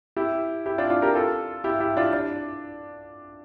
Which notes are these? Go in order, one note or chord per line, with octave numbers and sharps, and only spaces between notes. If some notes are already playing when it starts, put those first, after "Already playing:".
E4 G4
E4 G4
D4 F4
D4 F4
G4 A#4
F4 A4
E4 G4
E4 G4
D4 F4
D4